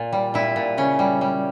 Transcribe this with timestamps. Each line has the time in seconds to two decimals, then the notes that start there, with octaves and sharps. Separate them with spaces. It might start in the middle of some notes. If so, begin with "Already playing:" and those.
Already playing: A#2
0.13 G3
0.34 A#2 E4
0.56 A#2
0.77 C#3 C#4
0.99 G3
1.21 G3